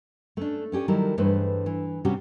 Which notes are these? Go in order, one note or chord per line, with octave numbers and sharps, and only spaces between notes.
A3 C#4 D4
B3 C#4 G4 D5 G#5
D#3 F#3 G3 E4 A4 A#4
G2 E3 A3 G#4 B4 C5
E3
C3 G3 C#4 F#4 G4